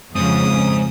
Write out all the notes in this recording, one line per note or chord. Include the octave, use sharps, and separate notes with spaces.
F2 G#2 C#3 D#6